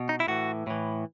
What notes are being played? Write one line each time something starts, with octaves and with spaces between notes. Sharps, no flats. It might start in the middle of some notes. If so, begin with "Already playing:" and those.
Already playing: B2
D#4
E4
A2 E3 F#4
A2 E3